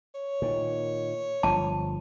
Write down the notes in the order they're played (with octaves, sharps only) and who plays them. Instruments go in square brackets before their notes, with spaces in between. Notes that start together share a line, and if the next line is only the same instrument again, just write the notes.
[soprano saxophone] C#5
[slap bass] A#2 D#3
[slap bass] G1 F3 [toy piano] A5